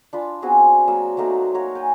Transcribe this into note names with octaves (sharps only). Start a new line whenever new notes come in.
D4 F4 B5
B3 C4 F#4 G#4
F#3 A#3 E6
F#3 A3 A#3 D#4
A#4 C#5 F#5
G5 G#5